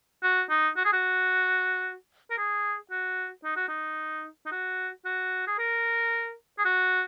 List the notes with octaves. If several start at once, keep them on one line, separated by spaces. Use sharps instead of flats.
F#4
D#4
F#4
G#4
F#4
A#4
G#4
F#4
D#4
F#4
D#4
D#4
F#4
F#4
G#4
A#4
G#4
F#4